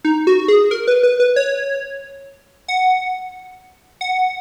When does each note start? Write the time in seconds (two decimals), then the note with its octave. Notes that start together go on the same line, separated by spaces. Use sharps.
0.05 D#4
0.27 F#4
0.48 G#4
0.71 A#4
0.87 B4
1.03 B4
1.20 B4
1.36 C#5
2.68 F#5
4.01 F#5